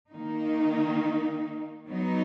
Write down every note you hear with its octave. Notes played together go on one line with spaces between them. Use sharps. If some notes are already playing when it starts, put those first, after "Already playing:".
D#3 A#3 D#4
F#3 B3 D#4